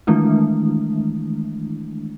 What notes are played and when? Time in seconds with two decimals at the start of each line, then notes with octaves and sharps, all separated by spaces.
0.07 D#3 E3 G#3 A3 D4 E4